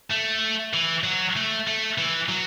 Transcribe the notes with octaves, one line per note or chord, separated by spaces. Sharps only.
A3
E3
F#3
A3
A3
E3
F#3